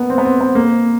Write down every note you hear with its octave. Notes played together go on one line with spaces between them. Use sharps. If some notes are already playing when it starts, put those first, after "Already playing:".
Already playing: A#3 B3
C4
B3
C4
B3
A#3